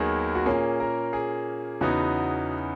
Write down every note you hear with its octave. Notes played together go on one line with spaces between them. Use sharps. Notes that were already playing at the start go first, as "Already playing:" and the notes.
Already playing: D#2 D#3 F#3 B3 D#4 G#4
F#4
A#2 A#3 C#4 G#4
A#4
G#4
E2 C#3 E3 B3 D#4 F#4